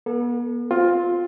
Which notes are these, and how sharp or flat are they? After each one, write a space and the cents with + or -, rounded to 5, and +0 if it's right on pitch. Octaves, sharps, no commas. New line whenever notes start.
B3 -40 A4 +0
C4 +0 F4 +10